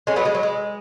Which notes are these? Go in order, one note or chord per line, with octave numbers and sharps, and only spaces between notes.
G#3 C#4
F#3 B3
G#3
F#3
G#3